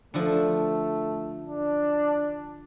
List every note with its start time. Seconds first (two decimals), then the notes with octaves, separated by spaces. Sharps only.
0.14 D3 F3 A3
1.47 D4